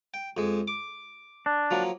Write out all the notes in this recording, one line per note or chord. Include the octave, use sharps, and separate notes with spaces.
G5
F2 G#3
D6
D4
F3 F#3 A#3